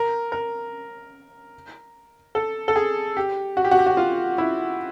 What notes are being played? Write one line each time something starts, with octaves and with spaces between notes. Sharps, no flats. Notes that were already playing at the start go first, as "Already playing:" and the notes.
Already playing: A#4
A#4
A4
A4
G#4
G4
F#4
G4
F#4
G4
F#4
F4
E4